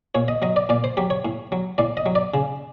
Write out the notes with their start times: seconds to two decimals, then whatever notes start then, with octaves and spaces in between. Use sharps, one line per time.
0.15 A#2 C#5
0.28 D#5
0.42 F#3 D#5
0.56 D5
0.69 A#2 D5
0.84 C5
0.97 F#3 G4
1.10 C#5
1.25 A2
1.52 F#3
1.78 A2 D5
1.97 D#5
2.06 F#3
2.15 D5
2.34 C#3